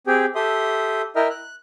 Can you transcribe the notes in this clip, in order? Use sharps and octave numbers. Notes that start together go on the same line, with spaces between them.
C4 G4 G#4 G5
G4 A4 E5 C6 D#6
E4 A#4 D#5 E5 G5 F6
F#6